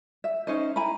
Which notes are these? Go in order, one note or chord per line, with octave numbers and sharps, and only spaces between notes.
E5
C#4 D#4 C5 D#5
E4 G#5 A#5 B5